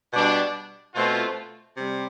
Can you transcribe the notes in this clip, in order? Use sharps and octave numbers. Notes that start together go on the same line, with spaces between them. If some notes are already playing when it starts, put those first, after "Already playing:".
B2 G3 D4
B2 A3 C4 F4
C3 G3